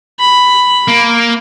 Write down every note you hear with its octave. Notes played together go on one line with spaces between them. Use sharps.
B5
A#3